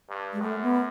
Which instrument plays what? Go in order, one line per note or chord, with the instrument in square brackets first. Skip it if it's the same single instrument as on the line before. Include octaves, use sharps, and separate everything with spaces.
[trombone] G2
[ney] G#3
[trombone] F#2 [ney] A3
[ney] B3